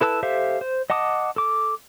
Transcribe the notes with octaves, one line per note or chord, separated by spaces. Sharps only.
E4 A4 B4 A5 E6
G4 A4 C5 E5 F5
C5
D#5 F#5 A5 D6 D#6
A4 D6